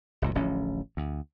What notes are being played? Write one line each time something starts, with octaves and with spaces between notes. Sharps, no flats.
F#1 C#2 A#2
D1 A1 F3 C#4
D2